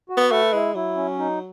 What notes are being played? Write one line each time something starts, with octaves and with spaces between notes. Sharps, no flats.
F#4
B3
A3 B4
G#3 E4
F#3 E4
C#4
D#4